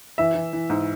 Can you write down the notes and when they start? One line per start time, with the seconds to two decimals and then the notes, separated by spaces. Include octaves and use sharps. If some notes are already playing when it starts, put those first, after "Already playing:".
0.18 E3 E5
0.35 E3
0.53 E3
0.70 G#2